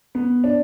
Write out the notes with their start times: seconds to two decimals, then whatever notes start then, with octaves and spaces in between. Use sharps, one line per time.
0.15 B3
0.44 D4